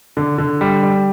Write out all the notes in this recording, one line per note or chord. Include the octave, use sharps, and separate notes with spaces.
D3
D3
G3
G3